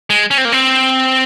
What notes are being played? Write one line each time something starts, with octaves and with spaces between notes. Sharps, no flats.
G#3
C#4
C4
A#3
C4